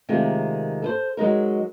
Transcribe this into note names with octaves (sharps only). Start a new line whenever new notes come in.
C3 D#3 G#3 A3 F4 A#4
A4 B4 C5
F#3 G#3 D#4 A#4